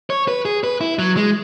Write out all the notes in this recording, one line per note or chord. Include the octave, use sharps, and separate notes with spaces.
C#5
B4
G#4
B4
E4
F#3
G#3